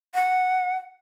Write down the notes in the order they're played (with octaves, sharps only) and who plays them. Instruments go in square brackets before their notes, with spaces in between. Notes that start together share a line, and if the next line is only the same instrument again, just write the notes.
[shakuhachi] F#5